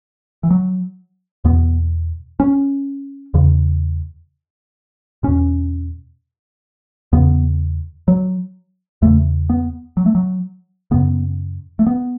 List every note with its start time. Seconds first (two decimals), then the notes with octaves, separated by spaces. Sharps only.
0.43 E3
0.50 F#3
1.45 E2 B2 B3
2.40 C#4
3.34 E2 C#3
5.23 E2 B2 C#4
7.13 E2 C#3 B3
8.08 F#3
9.02 E2 C#3 A3
9.50 B3
9.97 F#3
10.06 A3
10.15 F#3
10.91 F#2 C#3 B3
11.79 A3
11.86 B3